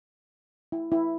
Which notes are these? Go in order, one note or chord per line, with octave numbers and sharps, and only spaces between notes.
E4
E4